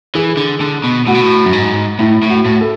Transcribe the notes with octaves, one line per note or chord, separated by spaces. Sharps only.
E3 G#4
D3
D3
B2
A2 F#4
B2
A2
F#2
G#2
A2 E4
A2
F#4
A2
A4